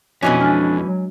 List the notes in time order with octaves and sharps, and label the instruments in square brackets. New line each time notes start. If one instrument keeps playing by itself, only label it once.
[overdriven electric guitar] F2 [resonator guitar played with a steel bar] B2 E3 C#4 [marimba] D4 F#4 D#5
[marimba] G#3 G#5 F6 [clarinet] D4
[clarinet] F#3